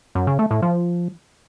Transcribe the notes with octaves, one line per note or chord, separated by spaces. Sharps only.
F#2
C#3
A3
A2
F3